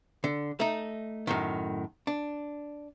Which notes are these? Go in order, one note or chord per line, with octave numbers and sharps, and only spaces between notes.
D3
A3 D#4
F#2 A2 D#3
D4